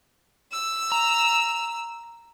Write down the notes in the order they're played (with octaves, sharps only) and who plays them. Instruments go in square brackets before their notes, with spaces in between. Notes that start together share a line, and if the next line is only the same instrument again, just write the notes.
[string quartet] E6
[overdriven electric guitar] A#5